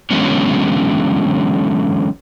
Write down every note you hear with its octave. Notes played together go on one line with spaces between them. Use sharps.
D3 E3 F#3 G#3 B3 C#4